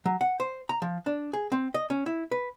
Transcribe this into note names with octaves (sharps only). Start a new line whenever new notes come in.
F#3
F#5
C5
A#5
F3
D4
G#4
C4
D#5
C#4
E4
B4